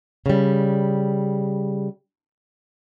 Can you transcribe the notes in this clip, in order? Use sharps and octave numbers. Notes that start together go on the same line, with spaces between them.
C#3 G3